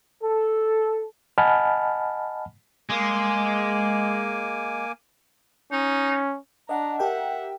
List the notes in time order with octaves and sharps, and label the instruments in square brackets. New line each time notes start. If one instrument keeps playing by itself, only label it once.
[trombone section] A4
[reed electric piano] D#5 F#5 G#5 A5 B5 F6
[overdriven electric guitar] G#3 [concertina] A#3 G#5 D6
[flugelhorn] C#4 [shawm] D#4
[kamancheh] D4 A#5 [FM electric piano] D#5 F#5
[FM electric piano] G4 A#4 G5 [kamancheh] E5 F#5